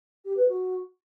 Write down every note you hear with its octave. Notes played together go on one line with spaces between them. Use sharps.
G4
B4
F#4